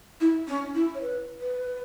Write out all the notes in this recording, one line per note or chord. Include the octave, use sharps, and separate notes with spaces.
E4
C#4
E4
C#5
B4
B4